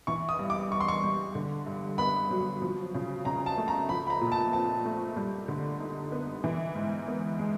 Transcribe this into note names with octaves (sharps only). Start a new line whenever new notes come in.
E3 C#6
D#6
G2
D6
G2 C#6
C6
C#6
G3
D3
G2
B3 B5
F#3
F3
C#3
C#3 A#5
A5
A3
A#5
F3 B5
B5
A#5
A#2
A5
C4 A5
A3
G3
D3
D#4
B3
E3
G#2
B3
G#3